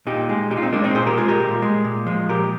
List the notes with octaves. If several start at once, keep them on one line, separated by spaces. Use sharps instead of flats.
A#2 D#4 G4
G#3
A#2 D#4 G4
F4
C4 D#4
G#3 A#3 D4
C4 D#4
A#2 G#4 C5
G4 A#4
G#3 F4 G#4
G4 A#4
A#2
G#3
A#2
F3 G#3
A#2 G4 A#4